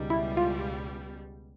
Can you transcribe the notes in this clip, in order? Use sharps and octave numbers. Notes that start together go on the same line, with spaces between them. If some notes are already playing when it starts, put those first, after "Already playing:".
Already playing: C#2 B2 G3 D#4
E4
F4